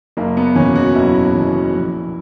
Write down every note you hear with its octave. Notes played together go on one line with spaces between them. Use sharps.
F#1 A#3
B3
E2 B2 C#4
F#4
F#1 E4
E2 B2
A#1